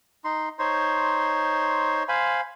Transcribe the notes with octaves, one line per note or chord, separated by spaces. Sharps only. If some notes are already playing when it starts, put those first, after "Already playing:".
D#4 C6
D#4 C5 C#5 C6
C5 F5 G#5 B5